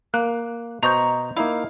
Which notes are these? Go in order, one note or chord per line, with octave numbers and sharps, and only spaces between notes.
A#3 F#6
B2 C5 D#5 A#5 C#6 G6
A#3 D#4 E4 F5